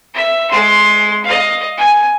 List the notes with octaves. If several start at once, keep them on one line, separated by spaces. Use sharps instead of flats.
E5
G#3 C6
D#5 F5
G#5